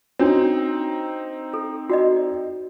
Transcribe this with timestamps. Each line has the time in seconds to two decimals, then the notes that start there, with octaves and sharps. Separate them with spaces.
0.19 C4 D4 D#4 F#4 C#5
1.54 A4
1.90 F#4 D5 D#5